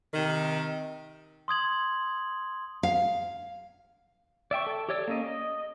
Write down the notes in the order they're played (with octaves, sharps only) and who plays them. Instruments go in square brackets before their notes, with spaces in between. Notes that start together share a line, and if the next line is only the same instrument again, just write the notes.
[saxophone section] C3 D#3
[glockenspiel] C6 D#6 G#6 F#7
[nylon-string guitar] F5
[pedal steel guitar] D5 E5 G5 C#6
A4
G4 A4 C#5 D5 E6
A#3 C#4 D#5
D#5